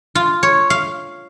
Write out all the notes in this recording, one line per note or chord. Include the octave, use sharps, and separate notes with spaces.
F4
C#5
F5